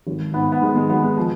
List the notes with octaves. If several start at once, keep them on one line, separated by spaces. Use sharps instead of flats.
G#1
G#2 B3
B3
D#3 G#3
G#3
G#1 B3
G#3
F3